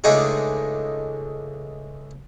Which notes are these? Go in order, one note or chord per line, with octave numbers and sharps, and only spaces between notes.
C#2 G#3 A3 D4 D#4 G#4